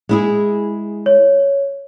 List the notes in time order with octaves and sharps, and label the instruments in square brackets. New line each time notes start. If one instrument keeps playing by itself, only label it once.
[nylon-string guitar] G#3 E4 G#4
[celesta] C#5